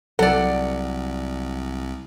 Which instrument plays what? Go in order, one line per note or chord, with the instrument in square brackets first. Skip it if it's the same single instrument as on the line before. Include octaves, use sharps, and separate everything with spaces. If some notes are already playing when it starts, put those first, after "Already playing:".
[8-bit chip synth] C2 [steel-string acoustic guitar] F#3 [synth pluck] A4 [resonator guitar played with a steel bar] D5 F#5